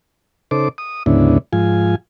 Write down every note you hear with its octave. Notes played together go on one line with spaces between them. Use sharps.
C#3 D#4 A4 C5 D6
D#6
D2 G#2 C#3 B3 D4 E4
G#2 F3 F4 G#5